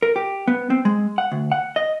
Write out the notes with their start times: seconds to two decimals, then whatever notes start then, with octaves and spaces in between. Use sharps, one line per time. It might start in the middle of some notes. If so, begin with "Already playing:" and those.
0.02 A#4
0.16 G4
0.48 B3
0.70 C4
0.85 G#3
1.18 F#5
1.32 D2
1.52 F#5
1.76 D#5